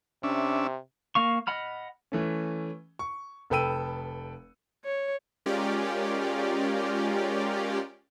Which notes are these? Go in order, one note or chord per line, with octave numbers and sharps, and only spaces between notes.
C3 C#4 D4 E5
A#3 F5 C#6
D#5 F#5 B5 F6
E3 A3 C#4
C#6
F1 A4 B4 G5 E6 D#7
C#5
G#3 C#4 F4 G4 A#4 D5